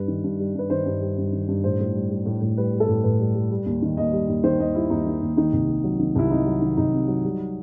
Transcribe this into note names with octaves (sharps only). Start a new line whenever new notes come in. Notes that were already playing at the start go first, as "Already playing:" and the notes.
Already playing: G2 G3 B4
D#3
G2
G3
G2 B4
D#3 C5
G2
G3
G2
D#3
G2
A2 C5
A2
G3
G3
A2
A2
G3 B4
G3
A4
A2
A2 B4
G3
G3
G3
D#2
D#3
D#2 D#5
G3
D#2
D#3 C5
D#2 D#5
G3 E4
D#2 D#4
D#3
D#2
D#3 D#4
C2
C3
F#3
D#3
C2 E4
C3 D#4
F#3
D#3
C2 D#4
C3
F#3
G3